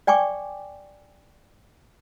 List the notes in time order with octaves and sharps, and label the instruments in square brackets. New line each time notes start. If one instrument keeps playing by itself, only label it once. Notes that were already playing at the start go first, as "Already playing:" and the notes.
[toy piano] D5 G5 G#5 C#6 D6